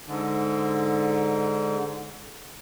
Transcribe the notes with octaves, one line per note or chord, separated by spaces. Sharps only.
G#2 D3